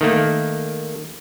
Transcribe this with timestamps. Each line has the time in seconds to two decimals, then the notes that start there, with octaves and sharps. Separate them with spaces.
0.01 D#3 A3 A#3